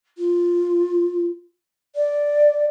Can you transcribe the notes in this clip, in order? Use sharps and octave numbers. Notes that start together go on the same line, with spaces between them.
F4
D5